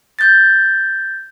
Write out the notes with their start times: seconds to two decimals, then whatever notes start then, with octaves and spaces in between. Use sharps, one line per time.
0.19 G6 A6